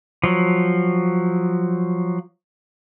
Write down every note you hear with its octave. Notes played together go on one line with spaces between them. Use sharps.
F3 F#3